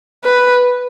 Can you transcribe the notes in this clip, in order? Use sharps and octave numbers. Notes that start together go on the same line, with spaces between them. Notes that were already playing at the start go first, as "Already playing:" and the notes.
B4